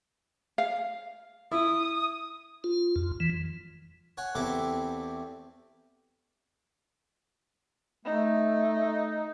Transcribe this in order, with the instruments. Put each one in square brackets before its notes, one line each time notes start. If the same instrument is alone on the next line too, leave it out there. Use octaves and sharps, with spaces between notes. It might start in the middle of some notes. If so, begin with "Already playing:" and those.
[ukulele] F5
[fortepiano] E4 [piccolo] D#6
[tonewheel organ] F4
F2
E3
[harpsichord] C#5 F#5 G#5
E2 A3 C4 E4 G4 D6
[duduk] A3 [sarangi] D#4